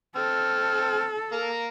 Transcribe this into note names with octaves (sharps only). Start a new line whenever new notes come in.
C4 A4 F6
A#3 A#4 A#5